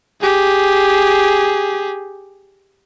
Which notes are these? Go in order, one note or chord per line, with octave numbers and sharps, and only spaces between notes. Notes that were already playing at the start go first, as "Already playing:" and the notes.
G4 G#4